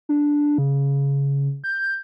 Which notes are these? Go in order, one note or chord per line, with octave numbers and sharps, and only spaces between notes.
D4
C#3
G6